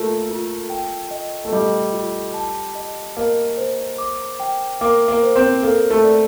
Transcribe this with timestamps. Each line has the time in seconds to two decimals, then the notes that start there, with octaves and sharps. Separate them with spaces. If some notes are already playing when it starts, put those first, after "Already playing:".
Already playing: A3 A#3 F4 A4
0.29 F4
0.70 G5
1.11 D#5
1.45 A3
1.53 G3 D#5
1.93 F4
2.34 A5
2.75 D#5
3.17 A#3 D#5
3.58 C5
3.98 D6
4.40 G5
4.81 A#3 D6
5.08 A#3
5.23 C5
5.36 C4
5.63 A#3 A4
5.90 A3
6.04 D5